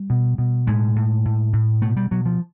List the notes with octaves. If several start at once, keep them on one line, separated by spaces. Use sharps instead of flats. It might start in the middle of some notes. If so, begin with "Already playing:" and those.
Already playing: G3
B2
B2
A2 G#3
A2
A2
A2
B2 A3
G3
B2 F#3
F3